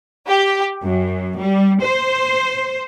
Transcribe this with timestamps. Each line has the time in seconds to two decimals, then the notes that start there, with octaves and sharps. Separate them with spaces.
0.27 G4
0.84 F#2
1.40 G3
1.82 C5